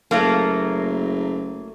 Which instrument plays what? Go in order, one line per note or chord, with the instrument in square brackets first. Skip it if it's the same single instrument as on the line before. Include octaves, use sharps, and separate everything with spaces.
[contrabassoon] F#1 [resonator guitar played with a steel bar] F#3 A3 A#3